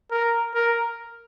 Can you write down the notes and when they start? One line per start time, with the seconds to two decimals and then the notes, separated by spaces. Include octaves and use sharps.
0.11 A#4
0.55 A#4